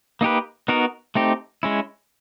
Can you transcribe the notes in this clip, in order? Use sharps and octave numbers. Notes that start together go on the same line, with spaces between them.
A#3 D#4 G4 B4
B3 D#4 F#4 A#4
A3 C4 D#4 G4
G#3 C#4 E4